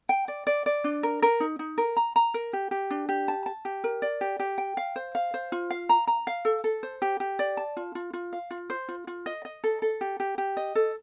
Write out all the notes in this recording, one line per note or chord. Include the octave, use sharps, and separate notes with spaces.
G5
D5
D5
D5
D4
A#4
A#4
D#4
D#4
A#4
A#5
A#5
A#4
G4
G4
D4
G4
A5
A5
G4
A#4
D5
G4
G4
G5
F5
C5
F5
C5
F4
F5
A#5
A#5
F5
A4
A4
C5
G4
G4
D5
A5
F4
F4
F4
F5
F4
C5
F4
F4
D#5
D#5
A4
A4
G4
G4
G4
D#5
A4